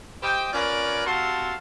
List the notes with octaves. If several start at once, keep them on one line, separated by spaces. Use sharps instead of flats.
G4 C5 D#5 G5
C#4 F4 A#4 B4 C#5 D5
C3 F#4 A4 F5 A5 C6